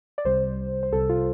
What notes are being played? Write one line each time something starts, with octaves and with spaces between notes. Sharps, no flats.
D5
C2 C3 G3 C5
C5
C2 C3 G3 A4
F4